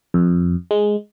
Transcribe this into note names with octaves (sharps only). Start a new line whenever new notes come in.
F2
G#3